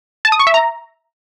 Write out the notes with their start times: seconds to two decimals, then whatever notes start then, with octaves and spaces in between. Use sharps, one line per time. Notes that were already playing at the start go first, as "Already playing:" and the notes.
0.25 A5
0.32 D#6
0.39 C#6
0.47 E5
0.54 A#5